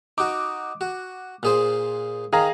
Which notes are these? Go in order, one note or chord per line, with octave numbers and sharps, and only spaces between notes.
D#4 F#4 D6
F#4
A#2 G#4 C5
D#3 G#4 F5 A#5